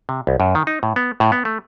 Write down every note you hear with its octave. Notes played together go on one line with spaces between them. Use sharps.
C3
C2
F#2
D#3
D#4
A2
B3
A2
B3
A3